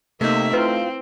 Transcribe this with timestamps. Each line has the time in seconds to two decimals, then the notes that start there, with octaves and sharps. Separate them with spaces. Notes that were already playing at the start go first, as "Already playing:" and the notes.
0.21 C3 A3 A#3 D#4 E5
0.53 C4 E4 F4 B4